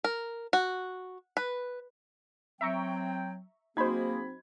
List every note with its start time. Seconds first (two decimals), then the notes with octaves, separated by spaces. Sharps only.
0.04 A#4
0.53 F#4
1.37 B4
2.61 F#3 C4 E5 G5 A#5 C#6
3.77 F#3 A#3 C4 D#4 G#4 C5 B5 G#6